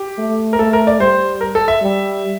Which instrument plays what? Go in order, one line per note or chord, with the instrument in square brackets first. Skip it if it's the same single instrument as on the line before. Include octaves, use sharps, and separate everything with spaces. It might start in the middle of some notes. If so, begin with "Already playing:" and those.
Already playing: [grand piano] G4
[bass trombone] A3
[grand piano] A#4
[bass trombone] A3 [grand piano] A4
[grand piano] A#4
D5
[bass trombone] G3 [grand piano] C5
[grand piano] A#4
A4
E5
[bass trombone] G3